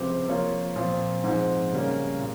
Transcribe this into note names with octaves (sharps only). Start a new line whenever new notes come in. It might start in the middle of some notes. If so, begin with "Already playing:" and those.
Already playing: C#2 C3 F3 C4 G4
F3 A#3 F4 A#4 C#5
A#2 F3 C4 F4
G#2 F3 C4
C#3 G3 A#3 C#4
A#2